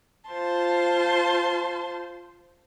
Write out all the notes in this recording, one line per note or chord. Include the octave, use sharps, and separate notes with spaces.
F4 C5 A5 C6